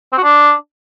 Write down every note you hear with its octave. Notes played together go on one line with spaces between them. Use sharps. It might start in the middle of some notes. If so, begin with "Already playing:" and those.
C4
F#4
D4